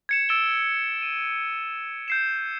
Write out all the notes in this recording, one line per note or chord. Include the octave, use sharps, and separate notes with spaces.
G#6 C#7 E7
E6 A6 D7 E7 G7
D#7
G6 C7 E7